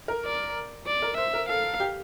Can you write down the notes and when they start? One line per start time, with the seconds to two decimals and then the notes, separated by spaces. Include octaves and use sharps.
0.08 A#4
0.25 D5
0.87 D5
1.02 A#4
1.17 C5 E5
1.33 A#4
1.49 A4 F5
1.80 G4